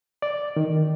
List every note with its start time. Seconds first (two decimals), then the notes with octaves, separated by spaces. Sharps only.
0.22 D5
0.56 D#3